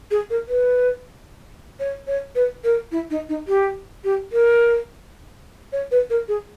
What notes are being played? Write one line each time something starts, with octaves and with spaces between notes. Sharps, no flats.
G#4
A#4
B4
C#5
C#5
B4
A#4
E4
D#4
D#4
G4
G4
A#4
C#5
B4
A#4
G#4